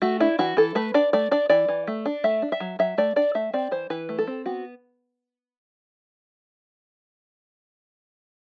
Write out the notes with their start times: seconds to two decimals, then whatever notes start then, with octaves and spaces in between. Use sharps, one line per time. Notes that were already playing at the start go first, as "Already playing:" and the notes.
0.02 A3 F#4
0.20 D4 E4
0.39 E3 F#4
0.57 E3 A4
0.75 A3 B4
0.94 D4 D5
1.13 A3 D5
1.31 D4 D5
1.49 E3 D5
1.68 E3
1.87 A3
2.06 D4
2.24 A3 E5
2.42 D4
2.52 E5
2.60 F#3
2.79 F#3 E5
2.98 A3 D5
3.16 D4 D5
3.35 A3 E5
3.53 C4 D5
3.71 E3 C5
3.90 E3 B4
4.09 A3
4.18 A4
4.27 C4
4.46 B3 F#4